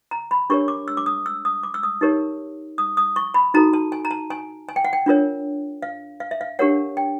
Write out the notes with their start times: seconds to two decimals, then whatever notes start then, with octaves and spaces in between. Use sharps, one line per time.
0.11 A#5
0.31 B5
0.50 D4 G4 A#4 C#5 C#6
0.68 D6
0.88 E6
0.97 D6
1.06 D#6
1.26 E6
1.45 D#6
1.63 D6
1.74 E6
1.83 D#6
2.01 D#4 G4 A#4 C#5
2.78 D#6
2.97 D#6
3.16 C#6
3.34 B5
3.54 D#4 F#4 A4 A#5
3.73 A5
3.92 G#5
4.05 A#5
4.11 A5
4.30 G#5
4.69 G#5
4.76 G5
4.85 F#5
4.93 G5
5.06 D4 F4 A#4 C#5
5.83 F5
6.20 F5
6.31 E5
6.41 F5
6.59 D4 G4 A#4 C#5 F#5
6.97 G5